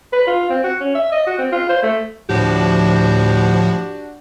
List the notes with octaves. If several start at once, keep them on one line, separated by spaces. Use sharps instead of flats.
B4
F4
C4
F#4
C#4
E5
D#5
F#4
C4
F4
C5
A3
D2 A2 F3 D4 F#4 G4